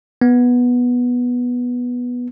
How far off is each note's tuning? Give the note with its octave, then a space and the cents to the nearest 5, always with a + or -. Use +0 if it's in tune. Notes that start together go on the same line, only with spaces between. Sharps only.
B3 -10